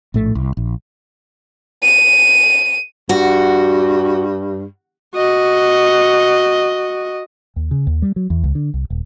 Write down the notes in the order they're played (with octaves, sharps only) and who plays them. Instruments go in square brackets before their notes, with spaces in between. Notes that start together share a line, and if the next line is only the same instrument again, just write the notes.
[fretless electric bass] A#1 A2 A3
C2
A#1
[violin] D#7
[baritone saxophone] G2 [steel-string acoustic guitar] F#4
[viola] F#4 D#5
[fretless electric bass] D#2
C#3
D#2
G3
F#3
E2
C#2
D3
C2
D#1